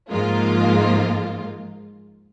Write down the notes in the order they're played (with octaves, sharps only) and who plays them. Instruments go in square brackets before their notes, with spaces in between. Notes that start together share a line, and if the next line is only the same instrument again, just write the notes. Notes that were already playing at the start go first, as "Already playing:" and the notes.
[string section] G#2 F3 G#3 A#3 F4